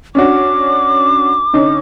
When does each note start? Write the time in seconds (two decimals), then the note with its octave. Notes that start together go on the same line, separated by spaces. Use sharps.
0.15 C#4 D4 F#4 D6
1.53 D3 C#4 D#4